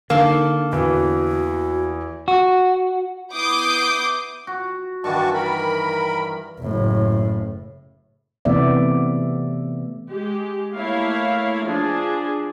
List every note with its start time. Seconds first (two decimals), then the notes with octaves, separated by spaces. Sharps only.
0.10 D3 A#3 D#4 A4
0.72 E2 E3 F#4
2.28 F#4
3.32 B3 E4 D6 D#6 G6 C7
4.47 F#4
5.04 G2 D#3 E3 F#4 A5 C#6
5.34 A#4 B5
6.60 F#1 A2
8.45 C3 E3 A3 B3 D5 E5
10.09 G#3 G4
10.74 A3 A#3 E4 C#5 F5
11.65 F3 D4 G#4